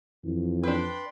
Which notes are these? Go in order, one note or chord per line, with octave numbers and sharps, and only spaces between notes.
F2 E3
D4 B4 G5 B5 C6